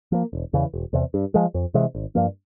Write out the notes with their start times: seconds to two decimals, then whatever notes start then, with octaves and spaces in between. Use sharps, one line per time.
0.12 F3 A#3
0.33 E1
0.53 E2 C#3 E3
0.74 E1
0.93 E2 C3
1.14 G2
1.34 F3 G#3
1.54 F2
1.74 C3 E3 G#3
1.95 G#1
2.15 G2 F3 A#3